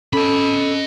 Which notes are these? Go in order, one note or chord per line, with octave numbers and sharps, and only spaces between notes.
C#4 A4 D#5 B5